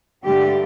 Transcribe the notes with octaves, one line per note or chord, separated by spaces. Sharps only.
G2 D3 A3 G4